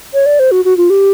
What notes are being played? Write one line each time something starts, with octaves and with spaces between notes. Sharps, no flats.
C#5
D5
C5
F#4
F#4
F4
G4